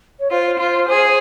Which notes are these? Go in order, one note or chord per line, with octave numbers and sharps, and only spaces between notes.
C#5
F4 C5
F4
G#4